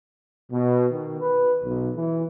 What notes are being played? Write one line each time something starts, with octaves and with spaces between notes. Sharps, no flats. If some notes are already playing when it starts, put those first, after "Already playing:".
B2
D#3
B4
B1
E3